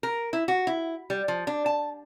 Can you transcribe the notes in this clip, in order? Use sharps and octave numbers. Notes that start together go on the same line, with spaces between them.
A#4
E4
F#4
E4
G3
F3
D4
A5